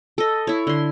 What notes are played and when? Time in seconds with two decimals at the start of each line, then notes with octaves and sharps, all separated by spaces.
0.18 A4 D#5
0.47 E4 C#5
0.67 D3 C6